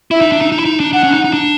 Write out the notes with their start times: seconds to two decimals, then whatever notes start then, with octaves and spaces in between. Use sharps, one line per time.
0.11 E4 E5
0.21 D#4
0.32 D4
0.41 D#4
0.52 D#4
0.59 E4
0.65 D#4
0.80 D4
0.93 D4 F#5
1.04 C#4
1.14 D#4
1.24 D#4
1.33 D4